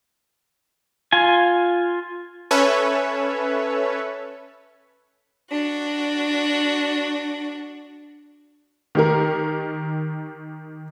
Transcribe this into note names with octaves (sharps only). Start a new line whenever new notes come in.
F4 G#5
C#4 A4 B4 C#5 E5
D4 F#4
D#3 G4 A#4